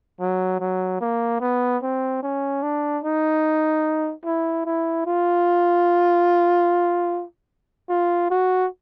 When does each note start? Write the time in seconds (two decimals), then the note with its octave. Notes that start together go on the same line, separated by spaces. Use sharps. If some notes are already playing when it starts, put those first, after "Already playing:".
0.20 F#3
0.60 F#3
1.01 A#3
1.41 B3
1.82 C4
2.23 C#4
2.63 D4
3.04 D#4
4.25 E4
4.66 E4
5.06 F4
7.90 F4
8.31 F#4